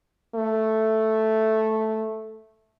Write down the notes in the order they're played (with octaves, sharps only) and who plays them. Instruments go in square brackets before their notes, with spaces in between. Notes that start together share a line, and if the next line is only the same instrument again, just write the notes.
[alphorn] A3